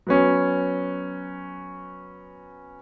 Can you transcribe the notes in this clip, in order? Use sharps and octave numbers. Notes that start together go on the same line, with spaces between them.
F#3 B3 C#4